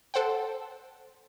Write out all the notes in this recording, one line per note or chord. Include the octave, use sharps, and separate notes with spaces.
A4 C5 F#5 G5